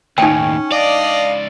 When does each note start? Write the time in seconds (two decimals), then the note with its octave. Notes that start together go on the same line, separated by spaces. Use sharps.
0.18 D#2 A2 C#4 D#4 G5
0.72 C#2 D4 D5 D#5 F5